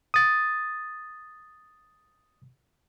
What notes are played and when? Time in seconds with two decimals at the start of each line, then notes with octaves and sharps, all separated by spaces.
0.14 D#6 A6